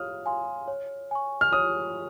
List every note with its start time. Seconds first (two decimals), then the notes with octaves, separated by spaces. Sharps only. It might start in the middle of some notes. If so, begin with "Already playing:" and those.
Already playing: C#5 F5 D#6 F6
0.26 F5 G#5 C6
0.68 C#5
1.11 G#5 C#6
1.41 F6
1.53 C#5 D#6